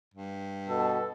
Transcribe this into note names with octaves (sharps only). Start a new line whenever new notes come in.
G2
B2 A4